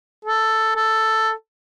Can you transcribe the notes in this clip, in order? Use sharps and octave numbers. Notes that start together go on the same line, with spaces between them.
A4
A4